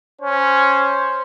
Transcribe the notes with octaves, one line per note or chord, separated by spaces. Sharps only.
C#4 C5